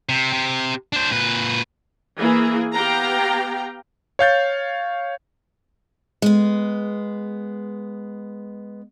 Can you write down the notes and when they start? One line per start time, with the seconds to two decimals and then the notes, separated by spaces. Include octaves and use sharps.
0.09 C3
0.33 C3
0.93 D4 C5
1.11 A#2 B4
2.18 E3 A#3 G#4
2.73 B3 G4 F5 G5 A#5
4.19 C#5 F5 G6 A6
6.22 G#3 B3